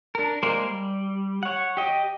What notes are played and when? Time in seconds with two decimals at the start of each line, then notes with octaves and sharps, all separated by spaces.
0.15 D4 A#4
0.43 G#3 A#3 A#4 C5 D5
0.64 G3
1.43 C#5 F#5
1.77 G4 D#5